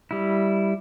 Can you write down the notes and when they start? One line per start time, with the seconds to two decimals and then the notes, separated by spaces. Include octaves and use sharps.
0.11 G3 E4